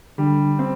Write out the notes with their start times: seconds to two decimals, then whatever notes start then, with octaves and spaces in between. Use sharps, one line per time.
0.18 D3 G3
0.59 C4